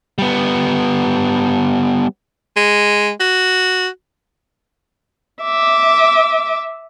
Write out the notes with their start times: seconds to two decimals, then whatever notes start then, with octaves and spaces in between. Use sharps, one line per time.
0.18 G3 B3
2.57 G#3
3.20 F#4
5.43 E5 D6